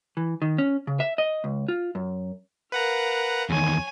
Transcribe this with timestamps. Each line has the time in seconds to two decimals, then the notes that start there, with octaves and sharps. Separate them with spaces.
0.17 E3
0.42 D#3
0.58 C#4
0.87 C#3
1.00 E5
1.18 D#5
1.44 C#2
1.68 F4
1.95 F#2
2.72 A#4 B4 F5 F#5 A#5
3.50 E2 D#3 C#5 G#5